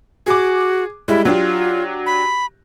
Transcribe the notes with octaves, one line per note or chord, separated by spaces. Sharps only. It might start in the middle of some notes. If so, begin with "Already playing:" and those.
F#4 G#4 D6
G3 G#3 E4
F#3 D4 F4 G4
B5